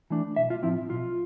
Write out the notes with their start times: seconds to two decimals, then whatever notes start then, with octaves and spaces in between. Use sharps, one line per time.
0.10 E3 A3 D4
0.36 B1 E5
0.50 F4
0.63 A2 F3 C4 E4
0.89 B1 F4